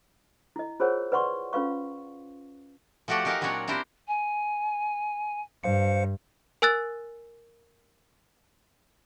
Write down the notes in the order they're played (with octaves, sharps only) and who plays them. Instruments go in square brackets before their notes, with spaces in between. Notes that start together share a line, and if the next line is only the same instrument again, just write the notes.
[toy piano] E4 D#5
F4 G#4 A#4 C5 C#5 F#5
B4 D5 F#5 C6 C#6
C#4 F4 B4 F5 C#6
[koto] F3 A3 F#4 G4 D5 F#5
D#4 G4 A#4 F5 F#5 G#5
A#2 F#3 C4 D4 C#5 F#5
C4 D4 E4 G4 A#4 C5
[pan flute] G#5
[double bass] G2 [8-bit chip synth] C5 F5 C#7
[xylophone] A#4 G#5 E6 F#6 A6